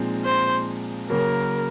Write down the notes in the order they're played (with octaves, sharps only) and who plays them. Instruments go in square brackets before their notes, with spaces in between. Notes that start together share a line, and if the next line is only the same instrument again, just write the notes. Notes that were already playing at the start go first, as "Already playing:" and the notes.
Already playing: [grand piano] A#2 F3 G#3 C4 D#4
[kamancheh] C5
[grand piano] C#3 F#3 A#3 [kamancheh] A#4